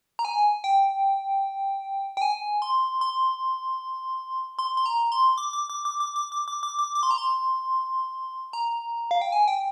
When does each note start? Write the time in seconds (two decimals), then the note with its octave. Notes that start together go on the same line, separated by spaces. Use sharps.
0.19 A#5
0.25 G#5
0.64 G5
2.17 G5
2.22 G#5
2.62 C6
3.01 C6
4.59 C6
4.77 C6
4.86 A#5
5.12 C6
5.38 D6
5.53 D6
5.70 D6
5.85 D6
6.00 D6
6.16 D6
6.32 D6
6.48 D6
6.63 D6
6.79 D6
6.95 D6
7.03 C6
7.11 A#5
7.18 C6
8.53 A#5
9.11 F5
9.22 G5
9.32 G#5
9.48 G5